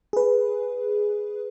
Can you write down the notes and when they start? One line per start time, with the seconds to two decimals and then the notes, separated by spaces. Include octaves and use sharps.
0.13 G#4 B4